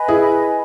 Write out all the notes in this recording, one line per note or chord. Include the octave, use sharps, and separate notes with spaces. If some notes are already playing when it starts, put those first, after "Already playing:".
Already playing: B4 D#5 G#5 B5
E4 G#4